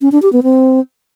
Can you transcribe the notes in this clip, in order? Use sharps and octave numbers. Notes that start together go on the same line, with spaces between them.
C#4
D4
G4
B3
C4